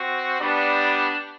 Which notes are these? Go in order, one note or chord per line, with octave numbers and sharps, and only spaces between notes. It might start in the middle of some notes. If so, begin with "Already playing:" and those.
Already playing: C4 F#4
G3 B3 D4